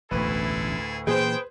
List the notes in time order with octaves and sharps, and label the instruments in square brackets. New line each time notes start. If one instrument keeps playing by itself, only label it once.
[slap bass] E1 A1 [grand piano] D2 A2 B4 [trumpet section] E4 G#4 A4
[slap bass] A#2 E3 A#3 [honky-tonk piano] G#4 C5 [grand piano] B4 [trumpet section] G5